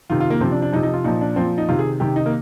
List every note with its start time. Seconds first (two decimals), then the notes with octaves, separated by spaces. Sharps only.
0.10 C3 D#3 F4
0.20 F4
0.30 A#3
0.40 C3 F3 C4
0.51 D4
0.62 D4
0.72 C3 F3 D#4
0.83 D#4
0.93 F4
1.04 A#2 F3 D#4
1.21 D4
1.36 A#2 F3 C4
1.58 D#4
1.68 C3 D#3 F4
1.79 G#4
2.00 C3 D#3 G4
2.16 D#4
2.26 A#3